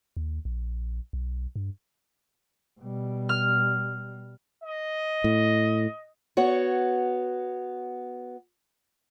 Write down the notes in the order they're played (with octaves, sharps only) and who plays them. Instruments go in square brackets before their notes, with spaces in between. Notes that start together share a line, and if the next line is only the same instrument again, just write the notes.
[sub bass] D#2
A#1
B1
G2
[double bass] B2 G3
[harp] F6
[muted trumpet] D#5
[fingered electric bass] A2
[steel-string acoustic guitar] B3 F#4 C#5